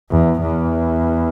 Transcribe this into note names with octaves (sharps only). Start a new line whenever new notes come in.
E2
E2